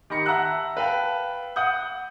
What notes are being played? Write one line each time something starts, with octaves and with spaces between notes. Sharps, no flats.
D#3 G4 B5 A#6 C#7
E5 F#5 A5 A#5 E6 F#6
B4 F5 G5 A5
F#5 D#6 G6